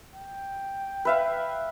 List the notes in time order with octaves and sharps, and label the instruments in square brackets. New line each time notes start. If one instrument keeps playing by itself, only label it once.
[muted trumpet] G5
[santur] B4 E5 F5